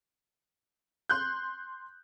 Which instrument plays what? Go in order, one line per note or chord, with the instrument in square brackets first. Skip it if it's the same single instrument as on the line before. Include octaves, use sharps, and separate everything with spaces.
[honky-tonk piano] C6 F#6 G6